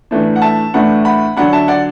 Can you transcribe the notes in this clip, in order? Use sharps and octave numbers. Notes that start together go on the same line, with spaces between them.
A2 E3 A3 D4
F#5
E5 A5
A2 E3 A3 D4 F#5 B5
F#5 B5
D3 F#3 D4 F#5 B5
E5 A5
D5 F#5